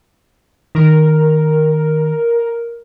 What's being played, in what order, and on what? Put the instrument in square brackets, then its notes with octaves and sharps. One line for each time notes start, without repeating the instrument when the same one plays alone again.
[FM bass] D#3 [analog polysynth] A#4